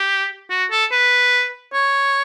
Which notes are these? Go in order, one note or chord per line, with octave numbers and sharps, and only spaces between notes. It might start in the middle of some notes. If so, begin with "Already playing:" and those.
Already playing: G4
F#4
A4
B4
C#5